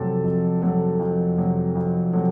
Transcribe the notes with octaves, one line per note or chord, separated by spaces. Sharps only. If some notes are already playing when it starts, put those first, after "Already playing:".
Already playing: F2 C3 F#3 A3 A5
F2
C3 F#3 A3
F2
C3 F#3 A3
F2
C3 F#3 A3